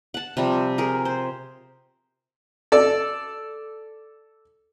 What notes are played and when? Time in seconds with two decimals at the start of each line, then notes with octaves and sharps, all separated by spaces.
0.14 F#5 A5
0.37 C3 F3 G3
0.78 G#4 A#4
1.05 C5
2.72 A4 D5